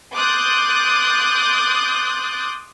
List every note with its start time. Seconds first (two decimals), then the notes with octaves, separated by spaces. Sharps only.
0.16 C6 D6 D#6 F#6 G6 A6